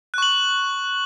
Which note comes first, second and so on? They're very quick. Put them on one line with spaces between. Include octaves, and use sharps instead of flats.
F#6 C#6 F#7